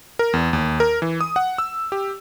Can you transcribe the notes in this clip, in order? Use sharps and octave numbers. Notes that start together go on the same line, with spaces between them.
A#4
E2
D#2
A#4
E3
D#6
F#5
E6
G4